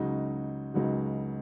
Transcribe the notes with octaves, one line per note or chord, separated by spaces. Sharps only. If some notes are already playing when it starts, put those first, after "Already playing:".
Already playing: C#2 C#3 F#3 D#4 F#4
C#2 C#3 F#3 D#4 F#4